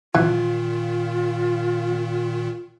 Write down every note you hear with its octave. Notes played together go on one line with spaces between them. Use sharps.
A#2 D#3 E3 F4